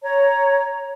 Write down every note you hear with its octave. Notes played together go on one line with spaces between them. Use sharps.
C#5 A#5